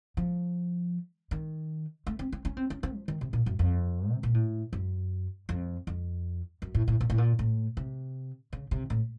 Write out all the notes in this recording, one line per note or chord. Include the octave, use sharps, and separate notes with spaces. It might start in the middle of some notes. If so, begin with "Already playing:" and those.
F3
D#3
A3
C4
C4
C#4
C4
C#4
C4
F3
D#3
C3
A#2
F#2
F2
C3
A#2
A2
F#2
F2
F2
F#2
A2
A2
A#2
A2
A#2
A2
C3
C#3
C3
A2